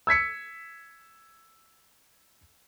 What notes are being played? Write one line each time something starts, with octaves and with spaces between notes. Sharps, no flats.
E6 G#6 B6 C#7